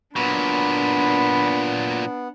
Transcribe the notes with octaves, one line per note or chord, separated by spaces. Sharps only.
A#2 F#3 B3 D4 B5